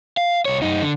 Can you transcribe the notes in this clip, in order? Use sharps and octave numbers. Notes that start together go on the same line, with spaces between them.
F5
C2 C#5
F#2 D#4
D3